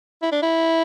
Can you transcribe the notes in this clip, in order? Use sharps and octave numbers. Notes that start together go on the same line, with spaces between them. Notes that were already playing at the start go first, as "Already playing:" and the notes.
E4
D4
E4